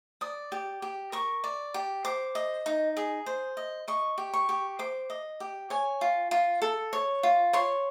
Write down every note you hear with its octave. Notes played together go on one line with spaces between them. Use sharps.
D5 D#6
G4
G4
A#4 C#6
D5
G4
C5 D6
D#5
D#4
G#4
C5
D#5
D#5 C#6
G4
C#6
G4
C5 D6
D#5
G4
C#5 G#5
F4
F4
A4
C#5
F4
C#5 C6